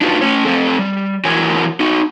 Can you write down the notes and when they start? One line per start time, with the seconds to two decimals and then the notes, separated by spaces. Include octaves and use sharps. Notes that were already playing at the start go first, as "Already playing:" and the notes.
0.01 D4 D#4 F4 F#4 A#4 B4
0.21 A3 C#4 C#5
0.45 A3 C4 A4
0.79 G3
1.25 E3 E4 F#4 A#4 C#5 G#5
1.80 D#4 F#4